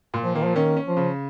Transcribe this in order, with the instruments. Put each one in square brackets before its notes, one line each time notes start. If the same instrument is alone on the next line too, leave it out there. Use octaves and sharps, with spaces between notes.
[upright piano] A#2
[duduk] F3
[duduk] D#3 [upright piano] A#3
[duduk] F3
[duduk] D#3 [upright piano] C#4
[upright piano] C#4
[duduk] F3
[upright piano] C#3